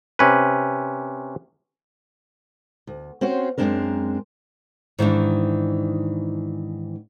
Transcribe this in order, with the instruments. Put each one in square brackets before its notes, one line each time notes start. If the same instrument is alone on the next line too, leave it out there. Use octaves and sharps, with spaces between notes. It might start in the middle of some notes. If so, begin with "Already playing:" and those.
[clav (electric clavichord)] C3 C#4 B4
[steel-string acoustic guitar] D2
C4 C#4 F#4 C5 C#5
F#2 A#2 G#3 C4 D4 A#4
[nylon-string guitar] G#2 D#3 E3 D4